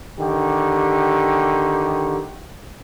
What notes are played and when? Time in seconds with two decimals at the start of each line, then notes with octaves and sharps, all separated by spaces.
0.19 D3 D#3 G4